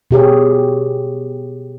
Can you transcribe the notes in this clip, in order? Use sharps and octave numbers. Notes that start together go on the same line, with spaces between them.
B2 G4 G#4 C#5